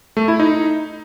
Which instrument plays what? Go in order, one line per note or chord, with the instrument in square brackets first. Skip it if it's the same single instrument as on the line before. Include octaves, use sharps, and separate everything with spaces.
[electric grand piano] A3
E4
D#4